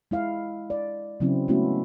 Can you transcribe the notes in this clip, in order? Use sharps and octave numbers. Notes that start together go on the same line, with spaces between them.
G#3 E4 F5
D5
C#3 F#3 C4 C#4 E4
G#3 A3 B3 C#4 E4 F#4